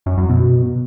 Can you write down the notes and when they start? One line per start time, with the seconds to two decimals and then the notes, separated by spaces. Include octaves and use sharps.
0.06 F#2
0.18 F#2
0.29 B2